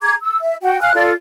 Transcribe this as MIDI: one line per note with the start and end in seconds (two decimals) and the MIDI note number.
0.02 0.14 68
0.02 0.14 82
0.02 0.14 86
0.02 0.14 92
0.20 0.37 88
0.43 0.55 76
0.63 0.79 66
0.63 0.79 78
0.63 0.79 79
0.81 0.94 77
0.81 0.94 80
0.81 0.94 89
0.81 0.94 90
0.95 1.12 65
0.95 1.12 69
0.95 1.12 74